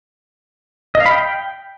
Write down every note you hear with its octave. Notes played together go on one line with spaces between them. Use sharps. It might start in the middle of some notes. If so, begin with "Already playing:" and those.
D#5
F5
B5
G5